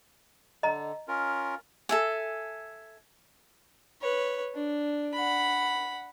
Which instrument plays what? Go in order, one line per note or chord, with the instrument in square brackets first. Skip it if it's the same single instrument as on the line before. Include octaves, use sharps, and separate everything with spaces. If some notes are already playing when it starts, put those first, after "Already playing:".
[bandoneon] D3 [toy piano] D#5 A#5
[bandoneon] C#4 F4 A#4
[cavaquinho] A4 E5 G#5
[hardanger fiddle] B4 C#5
D4
F#5 B5